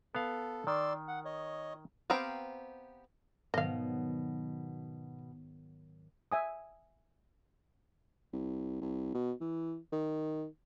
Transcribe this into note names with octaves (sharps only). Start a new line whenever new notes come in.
B3 A4 F5
D#3 D5 C6 E6
F#5
C#5 D#5
B3 C4 G4 F5 A#5
G#2 B2 D#3 F#3 D#5 F5
E5 G#5 D#6
C2
C2
B2
E3
D#3